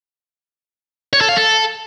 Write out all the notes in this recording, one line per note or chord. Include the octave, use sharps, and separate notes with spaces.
C#5
A4
F5
A4